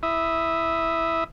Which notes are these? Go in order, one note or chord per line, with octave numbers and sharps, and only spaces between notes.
E4 E5 D#6